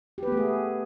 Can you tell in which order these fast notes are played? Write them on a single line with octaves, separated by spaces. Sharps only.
G4 B4 B3 A3 G#4